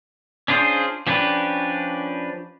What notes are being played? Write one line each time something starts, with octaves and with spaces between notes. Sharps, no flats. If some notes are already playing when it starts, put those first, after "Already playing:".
C#4 D4 F4 G#4 C5
F3 C#4 D4 G4 B4